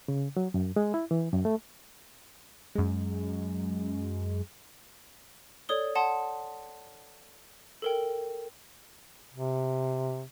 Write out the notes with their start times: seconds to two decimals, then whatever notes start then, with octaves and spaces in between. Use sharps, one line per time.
0.08 C#3
0.37 F#3
0.54 F#2
0.76 G#3
0.94 E4
1.11 E3
1.33 F#2
1.45 A3
2.75 F#2 G#3
5.69 A4 C#5 D5 D#6 G7
5.95 F#5 A5 C6 D#6
7.82 A4 A#4 G5
9.32 C3